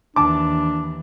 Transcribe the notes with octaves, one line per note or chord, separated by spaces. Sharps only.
D#2 E3 D4 A5 D6